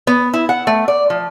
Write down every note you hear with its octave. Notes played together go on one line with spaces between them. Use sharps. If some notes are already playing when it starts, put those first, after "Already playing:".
B3
E4
F#5
A3
D5
F3